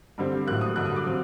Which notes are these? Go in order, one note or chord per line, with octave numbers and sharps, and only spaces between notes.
G2 D3 G3 C4
A2 F#3 A#3 F#6
D#6
G2 D3 F#3 F#6
D#6
D6
F#3 C4